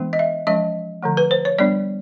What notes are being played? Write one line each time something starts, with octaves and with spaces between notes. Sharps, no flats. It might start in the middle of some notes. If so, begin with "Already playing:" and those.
Already playing: E3 G#3 B3 D4
D#5
E5
F3 G#3 C#4 D#5
D3 F3 A3
B4
C5
C#5
G3 B3 D4 D5